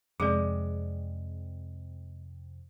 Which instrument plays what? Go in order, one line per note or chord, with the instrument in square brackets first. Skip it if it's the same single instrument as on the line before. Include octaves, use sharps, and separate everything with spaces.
[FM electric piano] F2 C3 [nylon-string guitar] G#3 [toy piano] G#4 D5